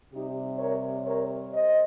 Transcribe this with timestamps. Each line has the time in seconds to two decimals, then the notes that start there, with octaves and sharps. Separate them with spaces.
0.12 C3 G3 D#4 G4
0.59 A#4 C#5
1.06 A#4 C#5
1.53 C5 D#5